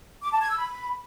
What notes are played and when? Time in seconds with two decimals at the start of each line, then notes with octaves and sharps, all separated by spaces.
0.22 D6
0.32 A5
0.41 G#6
0.50 E6
0.59 B5